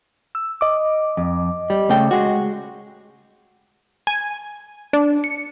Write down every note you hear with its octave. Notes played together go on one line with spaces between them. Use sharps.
E6
D#5 D6
F2
G3
C#3 A3 G5
G#3 F#4
G#5
D4
C#7